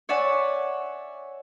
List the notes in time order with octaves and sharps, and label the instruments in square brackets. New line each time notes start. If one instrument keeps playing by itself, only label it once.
[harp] C#5 D5 E5 F#5 G#5